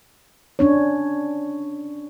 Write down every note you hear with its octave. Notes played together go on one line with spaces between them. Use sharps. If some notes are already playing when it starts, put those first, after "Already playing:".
C#4 D4 C#5